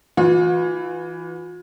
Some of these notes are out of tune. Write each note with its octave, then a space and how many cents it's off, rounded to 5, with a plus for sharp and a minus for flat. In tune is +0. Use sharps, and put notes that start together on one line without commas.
E3 +0 F4 +45